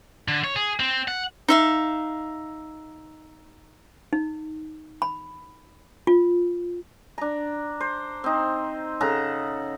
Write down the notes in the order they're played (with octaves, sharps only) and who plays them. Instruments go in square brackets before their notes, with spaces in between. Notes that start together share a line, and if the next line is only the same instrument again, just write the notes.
[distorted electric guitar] D3
C#5
G#4
C4
F#5
[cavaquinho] D#4 E5 F5
[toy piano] D#4
B5
F4
[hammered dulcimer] D4 A#5
C5
C4 D#4
C#3 A4 F#5 A#5